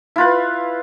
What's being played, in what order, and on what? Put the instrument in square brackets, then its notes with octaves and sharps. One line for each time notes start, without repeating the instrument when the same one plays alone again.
[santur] E4 F4 B4